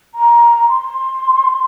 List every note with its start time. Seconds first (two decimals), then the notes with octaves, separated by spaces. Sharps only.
0.14 A#5
0.69 C6